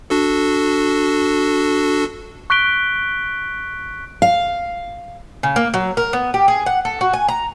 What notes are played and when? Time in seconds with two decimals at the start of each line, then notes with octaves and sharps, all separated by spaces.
0.10 D4 F#4 A4
2.50 C#6 F#6 B6 D7 G7
4.22 F5
5.43 C#3
5.56 A#3
5.74 F#3
5.97 A#4
6.13 B3
6.34 G4
6.48 G#4
6.66 F#5
6.85 A4
7.01 F#4
7.13 G#5
7.28 A#5